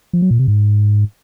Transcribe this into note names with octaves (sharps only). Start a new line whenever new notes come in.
F3
F#3
A#2
C3
G#2